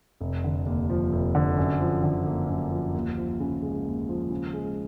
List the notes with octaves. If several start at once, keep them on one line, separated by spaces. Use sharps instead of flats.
F1
D3
D#2
F3
F1
D3
F#2
F3
D3
A#3
F#2
F3
D#2
F3
C#3
G#3
D#2
F3
C#3
G#3